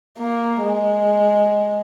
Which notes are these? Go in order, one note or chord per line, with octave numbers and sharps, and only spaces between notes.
A#3
G#3